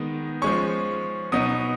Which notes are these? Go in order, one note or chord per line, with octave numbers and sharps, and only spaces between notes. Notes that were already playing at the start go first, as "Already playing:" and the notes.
Already playing: D#3 G#3 B3 D#4
F3 G#3 C#4 C#6
B2 F#3 B3 D#4 D#6